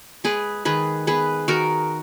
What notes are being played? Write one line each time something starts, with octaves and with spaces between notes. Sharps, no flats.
G#3 G#4 B4
D#3 G#4 B4
B3 G#4 B4
D#3 F#4 A#4